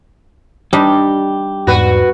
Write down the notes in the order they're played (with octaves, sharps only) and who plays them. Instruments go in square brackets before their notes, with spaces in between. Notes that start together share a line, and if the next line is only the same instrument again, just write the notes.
[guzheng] G3 D4 D#4 [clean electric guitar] G4
[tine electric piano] E2 G#2 D5 [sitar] F#4 B4